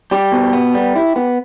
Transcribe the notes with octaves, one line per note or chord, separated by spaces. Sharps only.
G3 G4
B2
B3
G3
E4
B3